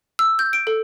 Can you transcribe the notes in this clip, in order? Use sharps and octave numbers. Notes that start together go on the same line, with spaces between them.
E6
G6
D7
A4